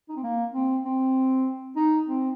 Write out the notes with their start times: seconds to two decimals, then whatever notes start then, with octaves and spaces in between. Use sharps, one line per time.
0.09 D#4
0.16 C4
0.23 A#3
0.54 C4
0.85 C4
1.76 D#4
2.07 C4